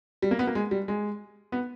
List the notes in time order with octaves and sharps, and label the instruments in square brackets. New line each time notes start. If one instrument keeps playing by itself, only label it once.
[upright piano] G3
A#3
B3
A#3
G#3
G3
G#3
B3